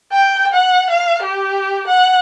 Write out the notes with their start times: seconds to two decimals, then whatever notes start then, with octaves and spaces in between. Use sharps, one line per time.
0.12 G5
0.53 F#5
0.90 F5
1.22 G4
1.87 F#5